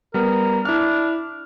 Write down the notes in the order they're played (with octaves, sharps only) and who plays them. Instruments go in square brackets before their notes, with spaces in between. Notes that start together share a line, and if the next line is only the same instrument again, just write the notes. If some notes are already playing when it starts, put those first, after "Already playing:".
[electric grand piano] G3 B3 [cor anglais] A#4
[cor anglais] D4 [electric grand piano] E4 F6